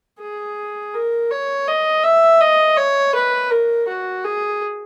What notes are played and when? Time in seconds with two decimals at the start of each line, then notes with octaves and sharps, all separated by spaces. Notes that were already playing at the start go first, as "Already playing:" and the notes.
0.21 G#4
0.94 A#4
1.31 C#5
1.68 D#5
2.04 E5
2.41 D#5
2.77 C#5
3.15 B4
3.51 A#4
3.88 F#4
4.25 G#4